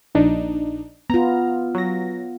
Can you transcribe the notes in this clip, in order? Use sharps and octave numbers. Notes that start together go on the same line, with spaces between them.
A#1 D4 D#4
B3 F4 A#5
F#3 A#6